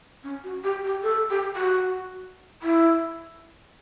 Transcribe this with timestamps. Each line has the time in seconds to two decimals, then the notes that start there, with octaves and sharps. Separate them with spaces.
0.23 C#4
0.44 F#4
0.64 G4
0.84 G4
1.03 A4
1.30 G4
1.56 F#4
2.63 E4